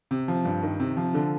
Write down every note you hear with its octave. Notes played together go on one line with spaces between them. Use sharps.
C3
F3
G2
D#3
C3
F3
D3